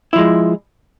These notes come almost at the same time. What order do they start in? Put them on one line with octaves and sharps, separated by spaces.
E4 F3 G#3